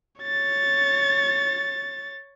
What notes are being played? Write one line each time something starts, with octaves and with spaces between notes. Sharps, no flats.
C#5 A6